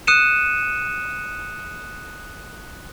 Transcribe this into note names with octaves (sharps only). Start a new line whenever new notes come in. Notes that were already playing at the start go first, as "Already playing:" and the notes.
D#6 F#6 C#7 D#7 E7